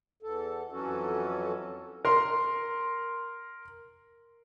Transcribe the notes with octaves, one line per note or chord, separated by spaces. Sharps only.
E2 A4
F2 E3 F#3 C#4 F#4 A4
A#4 C6